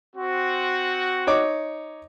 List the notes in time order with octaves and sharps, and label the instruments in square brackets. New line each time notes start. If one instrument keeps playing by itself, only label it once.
[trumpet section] C4 F#4
[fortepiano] D#4 C#5 D6